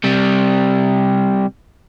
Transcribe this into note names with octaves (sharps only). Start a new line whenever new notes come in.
C3 G3